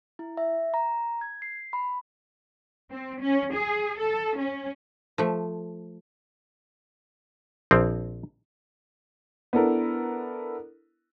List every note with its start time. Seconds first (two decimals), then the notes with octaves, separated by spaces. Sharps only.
0.19 E4
0.37 E5
0.74 A#5
1.21 G#6
1.42 C7
1.73 B5
2.91 C4
3.21 C#4
3.54 G#4
3.99 A4
4.37 C#4
5.18 F3 A3
7.71 A#1 F3 C4
9.53 B3 D4 E4 A4 A#4